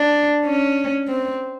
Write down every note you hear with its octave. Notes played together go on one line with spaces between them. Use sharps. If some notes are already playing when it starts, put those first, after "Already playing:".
Already playing: D4
C#4
C4